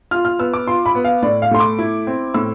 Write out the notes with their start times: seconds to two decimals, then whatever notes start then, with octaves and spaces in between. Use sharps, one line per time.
0.11 F4 F6
0.25 F6
0.39 B3 E6
0.54 D6
0.67 F4 C6
0.86 B5
0.95 B3
1.04 F5
1.23 A2 D5
1.42 F5
1.51 A3 C6
1.60 D6
1.79 E4
2.07 C4
2.34 A2 E6